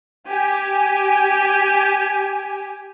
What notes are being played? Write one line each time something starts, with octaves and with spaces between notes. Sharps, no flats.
G4 G#5